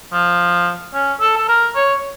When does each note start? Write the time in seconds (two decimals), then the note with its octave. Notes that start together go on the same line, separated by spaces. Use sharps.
0.13 F3
0.94 C#4
1.21 A4
1.37 A4
1.49 A#4
1.75 C#5